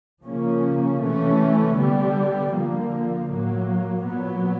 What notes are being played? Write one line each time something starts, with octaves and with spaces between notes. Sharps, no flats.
C#3 F3 A#3 C#4
C3 E3 A3 C#4
D3 G3 B3
D3 F3 A#3
A2 F#3 A#3
A#2 F#3 B3